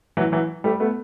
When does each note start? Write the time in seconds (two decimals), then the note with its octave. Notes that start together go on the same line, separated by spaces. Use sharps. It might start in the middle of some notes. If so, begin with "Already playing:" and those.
0.17 E3 F#3
0.32 E3 F#3
0.64 G3 A3
0.80 A3 B3